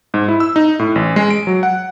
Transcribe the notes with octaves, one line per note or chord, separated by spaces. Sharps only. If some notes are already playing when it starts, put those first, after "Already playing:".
G#2
E4
E6
D#4
A2
A1
G#3
D7
F#3
F#5